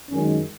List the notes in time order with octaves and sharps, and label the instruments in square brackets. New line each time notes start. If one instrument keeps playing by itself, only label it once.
[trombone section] F#2 D#3 G#3 C#4